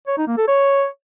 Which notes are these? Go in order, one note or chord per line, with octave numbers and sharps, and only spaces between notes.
C#5
D#4
A#3
A4
C#5